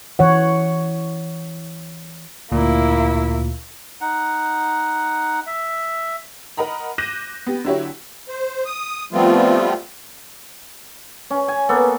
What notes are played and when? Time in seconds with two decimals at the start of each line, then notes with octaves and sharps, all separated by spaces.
0.19 E3 C#5 F#5
2.52 D2 A#2 A#3 E4
4.01 D#4 F#5
5.46 E5
6.57 A#4 D#5 F#5 A#5 B5
6.98 D6 F#6 G6 A#6 D#7 E7
7.47 B3 G4
7.65 D3 F#3 E4 F#4 G4 C#5
8.29 C5
8.66 D#6
9.12 F3 G3 A3 B3 C4 F4
11.30 C#4
11.48 G#5
11.69 A#3 B3 A4